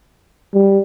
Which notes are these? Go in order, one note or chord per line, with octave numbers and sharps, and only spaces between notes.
G3